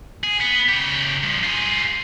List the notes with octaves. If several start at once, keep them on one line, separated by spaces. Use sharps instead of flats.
G#4
B3
C#3 G4
G2 F3
F4 G#4